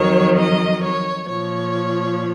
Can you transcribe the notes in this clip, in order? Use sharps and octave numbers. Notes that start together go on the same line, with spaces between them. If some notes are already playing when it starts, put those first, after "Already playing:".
Already playing: F2 D#3 F#3 C#5
D#5
C#5
A#2 F3 C#5